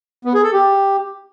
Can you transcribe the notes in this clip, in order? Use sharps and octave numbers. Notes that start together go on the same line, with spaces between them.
B3
G#4
A4
G4